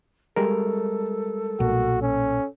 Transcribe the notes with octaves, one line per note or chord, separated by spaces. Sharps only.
G3 G#3 A4 A#4
B1 A#2 F#4
C#4